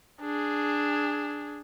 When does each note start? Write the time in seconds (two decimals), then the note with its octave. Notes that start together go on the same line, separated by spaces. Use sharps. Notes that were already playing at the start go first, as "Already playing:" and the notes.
0.21 D4 G#4